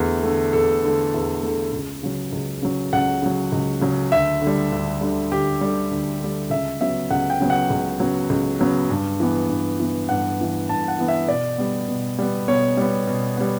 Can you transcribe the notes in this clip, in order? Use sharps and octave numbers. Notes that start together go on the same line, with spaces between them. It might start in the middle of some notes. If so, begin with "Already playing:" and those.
Already playing: E2 D3 A3
D3 A3
E2 A4
D3 A3
E2
D3 A3
C#2
C#3 F#3
C#2
C#3 F#3
C#2 F#5
C#3 F#3
C#2
C#3 F#3
D2 E5
D3
G3
D2
D3 G3
D2 G4
D3 G3
D2
D3 G3
C#2 E5
C#3 F#3 B3 E5
C#2 F#5
G5
C#3 F#3 B3
F#5
C#2
C#3 F#3 B3
C#2
C#3 F#3 B3
G2
E3 B3
G2
E3 B3
G2 F#5
E3 B3
G2 A5
F#5
E3 B3
E5
B2 D5
G3 B3
B2
G3 B3
B2 C#5
G3 B3
B2
G3 B3